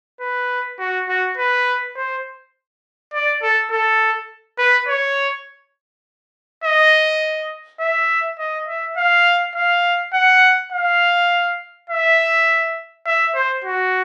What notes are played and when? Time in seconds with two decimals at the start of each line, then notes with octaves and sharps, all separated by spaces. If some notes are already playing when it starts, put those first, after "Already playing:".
0.20 B4
0.79 F#4
1.08 F#4
1.37 B4
1.96 C5
3.13 D5
3.42 A4
3.71 A4
4.59 B4
4.88 C#5
6.64 D#5
7.80 E5
8.39 D#5
8.68 E5
8.97 F5
9.56 F5
10.14 F#5
10.72 F5
11.90 E5
13.06 E5
13.35 C5
13.64 F#4